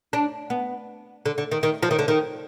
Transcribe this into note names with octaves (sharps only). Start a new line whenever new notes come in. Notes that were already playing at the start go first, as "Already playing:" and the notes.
D4
B3
D3
D3
D#3
D#3
F3
D#3
D3
D#3